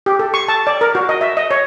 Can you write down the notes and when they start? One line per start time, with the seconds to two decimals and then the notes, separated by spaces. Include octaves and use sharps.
0.06 G4
0.19 A4
0.34 C#6
0.48 A5
0.67 D5
0.81 A#4
0.95 F#4
1.09 D#5
1.21 E5
1.37 D#5
1.51 C#5